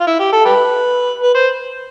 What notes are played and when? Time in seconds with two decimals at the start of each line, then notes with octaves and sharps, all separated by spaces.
0.01 F4
0.07 E4
0.20 G4
0.33 A4
0.45 G4 B4
1.23 B4
1.35 C5